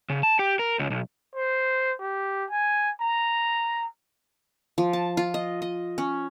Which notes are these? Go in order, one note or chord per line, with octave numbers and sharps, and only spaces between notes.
C#3
A5
G4
A#4
C#2
B1
C5
G4
G#5
A#5
F3
A5
F4
D#5
D#5
C#4